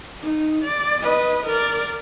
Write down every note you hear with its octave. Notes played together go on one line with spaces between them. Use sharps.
D#4
D5
B4 D#5
A#4 D5